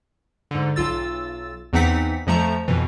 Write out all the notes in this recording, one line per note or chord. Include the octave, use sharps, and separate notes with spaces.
G#2 D3
B1 F4 E6 A6
E2 E3 C4 D#4 F#5 B6
F2 F3 A3 A#5
F2 B2 E3